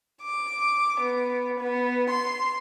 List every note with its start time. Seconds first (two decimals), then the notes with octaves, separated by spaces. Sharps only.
0.22 D6
1.01 B3
1.59 B3
2.10 C6